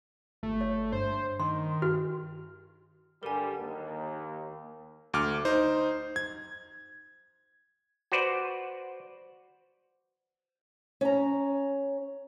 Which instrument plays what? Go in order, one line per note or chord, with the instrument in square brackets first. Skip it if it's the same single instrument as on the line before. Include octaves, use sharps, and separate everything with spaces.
[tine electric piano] G1 [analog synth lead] A3
[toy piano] C#5
[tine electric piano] G2 [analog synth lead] C5
[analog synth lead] D#3 [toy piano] C6
[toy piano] F#4 [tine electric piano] F6
[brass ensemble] G2 D3 G3 [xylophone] A#4 G#5
[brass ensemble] D#2
[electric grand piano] D2 D6 F6
D#4 C5
G#6
[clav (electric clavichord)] F#4 B4 C5 D5
[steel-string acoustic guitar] C#4 A#5